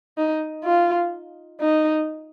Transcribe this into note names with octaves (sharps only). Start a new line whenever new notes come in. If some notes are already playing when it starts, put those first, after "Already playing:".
D#4
F4
D#4